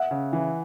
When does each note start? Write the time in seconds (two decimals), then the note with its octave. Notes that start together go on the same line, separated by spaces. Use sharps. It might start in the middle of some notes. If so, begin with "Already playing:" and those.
Already playing: E5 F#5
0.11 C#3
0.33 E3